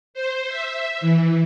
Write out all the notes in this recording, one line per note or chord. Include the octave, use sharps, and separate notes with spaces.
C5
E5
E3